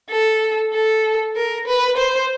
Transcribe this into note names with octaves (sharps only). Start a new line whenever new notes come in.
A4
A4
A#4
B4
C5